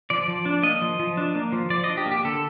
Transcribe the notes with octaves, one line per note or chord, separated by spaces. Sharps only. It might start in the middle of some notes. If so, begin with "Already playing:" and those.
F3 D5
F3
D4
A#3 D#5
F3
F3
D4
A#3
F3
F3 D5
D#5
D4
G4
A#3
G4
D3 A4